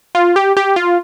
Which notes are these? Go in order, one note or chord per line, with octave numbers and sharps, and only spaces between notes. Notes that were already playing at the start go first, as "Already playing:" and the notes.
F4
G4
G4
F4